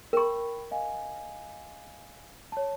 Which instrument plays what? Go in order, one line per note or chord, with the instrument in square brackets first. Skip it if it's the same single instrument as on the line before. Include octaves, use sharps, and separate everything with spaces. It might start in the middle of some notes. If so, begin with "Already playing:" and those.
[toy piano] A#4 C#6 [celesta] G5 B5
[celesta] D#5 F5 G#5
C#5 A5